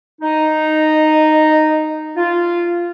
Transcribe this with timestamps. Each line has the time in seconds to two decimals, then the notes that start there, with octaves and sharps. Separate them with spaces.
0.21 D#4
2.15 F4